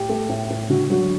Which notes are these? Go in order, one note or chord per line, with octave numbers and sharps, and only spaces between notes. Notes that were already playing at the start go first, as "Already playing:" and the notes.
Already playing: A2 G4
A3
A2
A2
D3 F#4
F#3 F#4